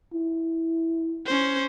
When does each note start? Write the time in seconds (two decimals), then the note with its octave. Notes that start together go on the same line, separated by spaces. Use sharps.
0.13 E4
1.26 C#4 C5